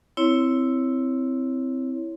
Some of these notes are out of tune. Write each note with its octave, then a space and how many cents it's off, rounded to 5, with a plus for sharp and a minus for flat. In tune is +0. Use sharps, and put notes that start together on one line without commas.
C4 -5 E4 +0 C#5 +0